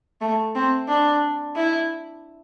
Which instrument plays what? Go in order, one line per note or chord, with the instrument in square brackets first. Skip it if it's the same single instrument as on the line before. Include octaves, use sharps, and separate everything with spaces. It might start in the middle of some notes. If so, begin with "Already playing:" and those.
[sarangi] A3
C4
D4
E4